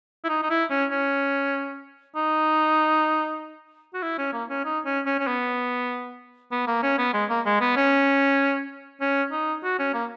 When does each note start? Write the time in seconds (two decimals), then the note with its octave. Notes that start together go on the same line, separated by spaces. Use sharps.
0.24 E4
0.29 D#4
0.43 D#4
0.50 E4
0.70 C#4
0.91 C#4
2.16 D#4
3.94 F#4
4.03 E4
4.18 C#4
4.33 A#3
4.49 C#4
4.65 D#4
4.86 C#4
5.06 C#4
5.19 C#4
5.27 B3
6.51 B3
6.67 A#3
6.83 C#4
6.98 B3
7.14 G#3
7.30 A#3
7.45 G#3
7.61 B3
7.76 C#4
9.01 C#4
9.32 D#4
9.64 F#4
9.79 C#4
9.94 A#3